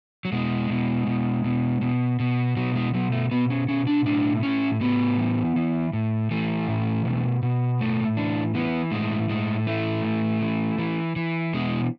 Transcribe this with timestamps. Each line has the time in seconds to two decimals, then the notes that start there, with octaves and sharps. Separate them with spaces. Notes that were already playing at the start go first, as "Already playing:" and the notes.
0.25 F#3
0.32 B2 G#3
0.70 B2
1.07 B2
1.44 B2
1.81 B2
2.20 B2
2.56 B2 F#3
2.75 G#3
2.94 B2 F#3
3.12 A3
3.31 B2 B3
3.50 C#4
3.69 B2 C#4
3.87 D4
4.06 A2 D4
4.43 A2 C#4
4.81 A2 B3
5.18 E3
5.56 E3
5.93 A2
6.31 E3 A3
6.68 A2
7.05 B2
7.43 B2
7.80 A2 A3
8.17 E3 D4
8.55 E3 B3
8.92 A2 G#3
9.29 A2 G#3
9.67 E3 A3
10.04 A2
10.42 E3
10.78 E3
11.16 E3
11.53 B2 G#3